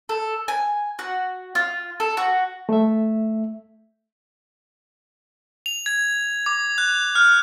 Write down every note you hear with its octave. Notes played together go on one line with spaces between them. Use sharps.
A4
G#5
F#4
F4
A4
F#4
A3 E5
F7
G#6
D6
F#6
F6